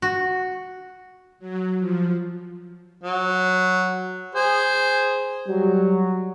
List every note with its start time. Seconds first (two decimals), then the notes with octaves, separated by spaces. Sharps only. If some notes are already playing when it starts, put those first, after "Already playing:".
0.02 F#4
1.39 F#3
1.79 F3
3.03 F#3
4.35 G#4 C5
5.48 F#3 G3